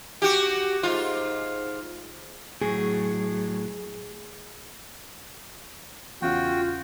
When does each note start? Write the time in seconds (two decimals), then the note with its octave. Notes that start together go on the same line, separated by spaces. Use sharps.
0.22 F#4 G4
0.83 G#2 F4
2.62 A2 F#3 G#4
6.22 E2 C#3 F4 F#4 F5 G5